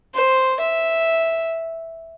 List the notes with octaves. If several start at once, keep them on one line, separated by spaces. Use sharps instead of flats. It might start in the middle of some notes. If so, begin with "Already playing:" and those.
C5
E5